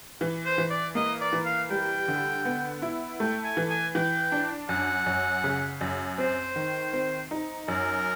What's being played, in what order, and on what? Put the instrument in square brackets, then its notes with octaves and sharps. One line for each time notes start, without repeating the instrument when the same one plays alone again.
[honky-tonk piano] E3
[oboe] C5
[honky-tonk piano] E3
[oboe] D5
[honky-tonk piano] A#3 [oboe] D#5
[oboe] D5
[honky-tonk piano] E3
[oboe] F5
[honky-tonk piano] G3 [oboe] G5
[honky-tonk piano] D3
B3
E4
[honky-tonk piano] A3 [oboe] G5
[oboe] G#5
[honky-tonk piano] E3
[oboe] G#5
[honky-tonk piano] E3 [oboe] G5
[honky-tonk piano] D4
[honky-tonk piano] F#2 [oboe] F#5
[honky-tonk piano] F#2
C#3
F#2
[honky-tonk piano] C4 [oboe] C5
[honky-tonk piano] D#3
C4
D#4
[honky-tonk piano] F#2 [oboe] A#4